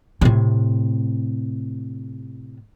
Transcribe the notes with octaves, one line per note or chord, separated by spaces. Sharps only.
A2 C3